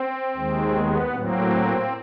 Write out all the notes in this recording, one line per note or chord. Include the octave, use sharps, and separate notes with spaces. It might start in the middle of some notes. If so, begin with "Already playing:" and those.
Already playing: C4
D#2 D#3 G#3
B3
A2 F#3 A#3 C4